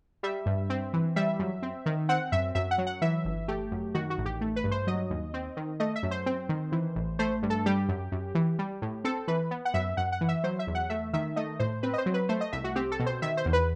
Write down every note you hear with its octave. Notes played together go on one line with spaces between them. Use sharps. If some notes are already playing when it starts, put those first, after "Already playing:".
G3 E5
G2
C4
E3
G3 E5
F#2
C4
D#3
C4 F#5
F#2 E5
F#2 E5
F#5
F#3
F#5
E3 E5
G1
A3 G4
F#2
D#3 F#4
F#4
A1
G4
A3
B4
G2
C5
F#3 D#5
D#2
C4
D#3
A3 D#5
E5
F#2
C5
C4
D#3
E3
A1
A3 C5
G2
A4
G3 G4
F#2
F#2
E3
G3
A2
C4 A4
E3 B4
B3
F#5
F#2 E5
F#2 F#5
F#5
E3
E5
F#3 C5
E5
E2
F#5
A3 E5
D#3 E5
A3 D#5
A2 C5
C4 B4
D#5
C5
F#3
B4
A3 C5
D#5
C2 E5
F#4
C4 G4
A4
B2
C5
D#3 E5
C5
E2
B4